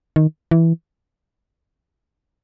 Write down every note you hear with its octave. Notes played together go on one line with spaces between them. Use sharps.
D#3
E3